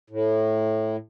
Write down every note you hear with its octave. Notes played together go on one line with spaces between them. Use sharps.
A2